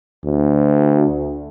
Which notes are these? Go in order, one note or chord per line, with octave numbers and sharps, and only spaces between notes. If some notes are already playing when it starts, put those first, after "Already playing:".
D2